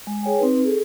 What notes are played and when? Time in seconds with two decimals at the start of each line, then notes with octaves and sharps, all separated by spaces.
0.07 G#3
0.23 G#4 C#5 G5 G#5
0.39 C4 D#4 B4
0.65 G#4 A4